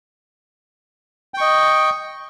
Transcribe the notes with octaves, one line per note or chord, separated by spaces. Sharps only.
D#5 G5 C#6